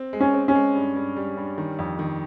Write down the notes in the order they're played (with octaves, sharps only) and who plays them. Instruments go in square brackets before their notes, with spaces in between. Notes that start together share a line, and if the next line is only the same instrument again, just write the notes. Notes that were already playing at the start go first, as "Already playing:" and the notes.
Already playing: [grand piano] C4
G#3
[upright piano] C#4
[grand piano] C4
[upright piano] C#4
[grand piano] G#3
G2
G2
G3
G2
D#3
F2
D#3